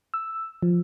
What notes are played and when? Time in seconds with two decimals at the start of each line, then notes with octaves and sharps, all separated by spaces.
0.14 E6
0.63 F3